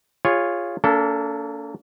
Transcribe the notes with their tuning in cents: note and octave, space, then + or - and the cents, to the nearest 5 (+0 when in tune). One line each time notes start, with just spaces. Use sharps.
F4 -5 G#4 -25 C#5 +0
A#3 -25 D4 -45 A4 +0